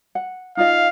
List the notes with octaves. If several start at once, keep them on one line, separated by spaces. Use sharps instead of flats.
F#5
D#4 F4 D#5 F5